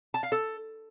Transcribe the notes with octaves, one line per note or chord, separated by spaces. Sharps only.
A5
F5
A4